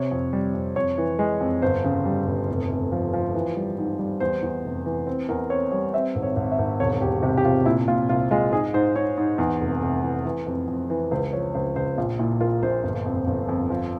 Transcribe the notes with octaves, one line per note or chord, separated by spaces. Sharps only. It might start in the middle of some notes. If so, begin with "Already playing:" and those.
Already playing: C3 C#5
F2
G3
F2
F2 C#5
E3
G#3
F2
G1 C5
C#3
G3
G1
F1
F1
F3
F3
E3
G3
G#2
G3
E2 C5
E2
F1
E3
C4
E2 A#4
C4 C#5
G3 C#5
C4 E5
G#1
C#5
G#1
E5
G#1
E1 C#5
E1 G4
C3 G4
G4
C3 F4
A#2 E4
A#2 F4
C2 F4
G#3 F4
G#2 G#4
G#2 C5
G#2 C#5
G#2
E2
F1
F1
E3
E3
F2
F2
E3
C#2 C5
F3 C#5
C#2 C5
C#2 C5
A#1 F4
A#2 E4
A#3 F4
A#1 C5
G1
F2
G1
F2
F3